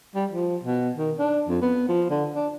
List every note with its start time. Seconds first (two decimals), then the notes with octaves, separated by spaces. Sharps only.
0.15 G3
0.31 F3
0.64 B2
0.97 D#3
1.19 D4
1.48 F2
1.62 B3
1.89 F3
2.10 D3
2.34 D4